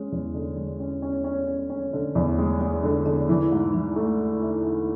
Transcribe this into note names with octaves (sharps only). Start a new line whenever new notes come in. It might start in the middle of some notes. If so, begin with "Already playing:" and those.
Already playing: G#3 C#4
E2
D3
G#3
C#4
C#4
C#4
C#4
C#4
D3
E2
G#3
G#3
D3
D3
E3
G#2
E3
A3
E4
E4
E4